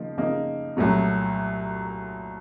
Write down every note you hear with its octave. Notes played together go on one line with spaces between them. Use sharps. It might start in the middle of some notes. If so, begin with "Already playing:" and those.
Already playing: C#3 F3 A#3 D#4
C#3 F3 A#3 D#4
C2 A#2 F#3 A3